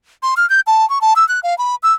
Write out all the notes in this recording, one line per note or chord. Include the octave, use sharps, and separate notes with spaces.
C6
F6
G6
A5
C#6
A5
E6
F#6
F5
B5
E6